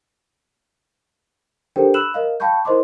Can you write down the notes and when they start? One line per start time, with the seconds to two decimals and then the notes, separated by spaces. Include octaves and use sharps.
1.76 D4 G4 A4 A#4 C5 G5
1.94 B5 E6 F#6 E7 F#7
2.14 A#4 D#5 F5
2.40 F5 G5 A5 B5 C#6 G6
2.65 E4 A#4 C5 D#5 C6 D6